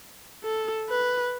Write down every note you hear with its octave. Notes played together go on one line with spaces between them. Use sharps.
A4
B4